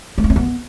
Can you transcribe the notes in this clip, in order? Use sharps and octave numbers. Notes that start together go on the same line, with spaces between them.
A3
D#4
C#4
B3